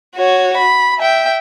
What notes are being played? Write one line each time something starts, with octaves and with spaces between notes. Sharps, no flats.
F#4 C#5
B5
E5 G5